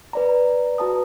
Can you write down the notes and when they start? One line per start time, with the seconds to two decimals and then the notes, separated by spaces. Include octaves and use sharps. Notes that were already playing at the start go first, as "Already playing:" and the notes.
0.13 B4 D5 A#5
0.78 F#4 B4 A5 A#5 D#6